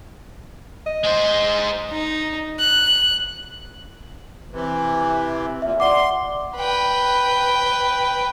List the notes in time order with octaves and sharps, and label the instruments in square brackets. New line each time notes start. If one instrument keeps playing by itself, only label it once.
[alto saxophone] D#5
[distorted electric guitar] G#3 C5
[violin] D#4
F#6
[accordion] C3 E3
[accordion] A#2 [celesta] E5
[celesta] D5 F#5 D6 [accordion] C6
[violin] B4 G5